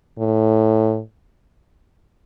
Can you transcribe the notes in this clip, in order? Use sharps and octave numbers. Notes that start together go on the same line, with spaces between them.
A2